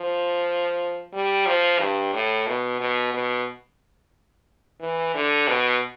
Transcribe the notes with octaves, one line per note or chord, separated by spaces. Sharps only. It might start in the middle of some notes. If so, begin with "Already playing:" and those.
Already playing: F3
G3
F3
G2
A2
B2
B2
B2
E3
D3
B2